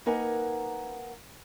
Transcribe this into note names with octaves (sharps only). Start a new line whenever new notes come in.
A#3 D#4 A#4 B4 F#5 G#5